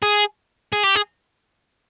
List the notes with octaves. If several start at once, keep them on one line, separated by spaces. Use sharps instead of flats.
G#4
G#4
G4
G#4